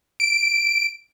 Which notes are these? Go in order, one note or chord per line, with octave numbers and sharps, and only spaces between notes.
D7